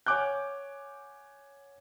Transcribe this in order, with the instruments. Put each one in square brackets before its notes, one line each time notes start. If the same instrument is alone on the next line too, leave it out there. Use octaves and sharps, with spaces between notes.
[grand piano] C#5 F#5 G#5 D6 F#6 G6